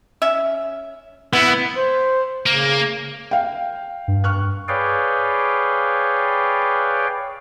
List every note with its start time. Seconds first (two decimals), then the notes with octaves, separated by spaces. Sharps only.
0.22 C#4 E5
1.33 B3 E4 F#5
1.76 C5
2.46 C#3 A#3
3.31 F5 G5
4.08 G2
4.24 C#6 F6 F#6
4.68 G#4 B4 C#5 D5 F5 G5